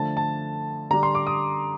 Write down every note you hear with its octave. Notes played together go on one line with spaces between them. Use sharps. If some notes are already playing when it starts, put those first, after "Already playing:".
Already playing: D3 F3 A3 A5
A5
D3 G3 D4 A#5
C6
D6
D#6